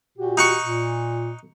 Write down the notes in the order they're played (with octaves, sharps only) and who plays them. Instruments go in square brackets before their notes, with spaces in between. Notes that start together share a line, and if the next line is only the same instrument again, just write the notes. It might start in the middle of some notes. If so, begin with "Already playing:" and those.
[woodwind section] A#2 F#4 G4
[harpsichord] D#4 F#5 C#6
[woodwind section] A#2